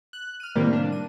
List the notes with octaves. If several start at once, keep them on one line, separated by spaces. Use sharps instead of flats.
F#6
F6 D#7
A2 C3 D#3 G3 A#3
D4
D#7